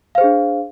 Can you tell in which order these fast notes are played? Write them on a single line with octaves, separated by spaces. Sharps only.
F5 C5 G#4 D4